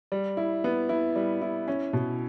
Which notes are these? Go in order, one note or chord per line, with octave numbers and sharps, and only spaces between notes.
G3
E4
B3
E4
G3
E4
C#4
B2